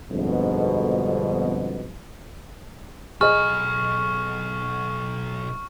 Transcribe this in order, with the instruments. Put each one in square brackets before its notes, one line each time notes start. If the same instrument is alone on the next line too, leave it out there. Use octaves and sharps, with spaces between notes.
[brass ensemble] G1 F2 G#2 B2
[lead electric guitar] B1 B5 [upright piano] G#4 D#5 [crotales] C#6 [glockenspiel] F6